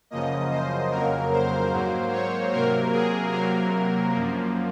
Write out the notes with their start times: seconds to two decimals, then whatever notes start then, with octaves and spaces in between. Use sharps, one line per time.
0.10 F#2 C#3 F3 A#3 D#5
0.51 C5
0.91 F2 C#3 F#3 A#3 A#4
1.32 C5
1.71 G#2 F#3 A#3
2.12 C#5
2.52 C3 F#3 A#3 A#4
2.92 G#4
3.32 C3 F#3 A#3 A#4
4.13 F#2 F3 A#3